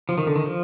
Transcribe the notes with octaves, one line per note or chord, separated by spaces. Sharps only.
F3
D#3
D3
D#3
F3